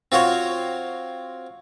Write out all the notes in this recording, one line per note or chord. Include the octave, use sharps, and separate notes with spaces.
C4 F4 F#4 C5 C#5